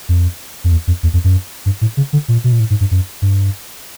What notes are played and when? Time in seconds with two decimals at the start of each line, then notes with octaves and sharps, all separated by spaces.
0.09 F2
0.64 F2
0.72 E2
0.87 F2
1.03 E2
1.13 F2
1.24 F#2
1.66 G2
1.81 A2
1.97 C#3
2.13 D3
2.28 A#2
2.44 B2
2.52 A#2
2.60 A2
2.70 G#2
2.80 G2
2.91 F#2
3.22 G2